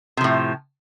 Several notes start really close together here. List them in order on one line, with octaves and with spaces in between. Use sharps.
C3 F3 A2